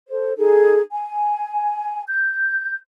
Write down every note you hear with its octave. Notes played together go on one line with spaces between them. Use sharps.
A4 C5
D#4 G#4 A4
G#5
G6